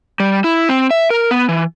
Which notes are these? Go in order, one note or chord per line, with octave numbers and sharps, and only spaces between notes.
G3
E4
C4
E5
A#4
B3
E3